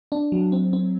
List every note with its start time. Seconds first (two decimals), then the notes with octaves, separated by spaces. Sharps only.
0.12 D4
0.32 F#3
0.52 C4
0.73 C4